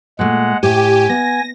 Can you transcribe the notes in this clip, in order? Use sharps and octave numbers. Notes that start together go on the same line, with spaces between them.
A#2 G#3 A3 F#5
A2 G4 G#5
B3 A#6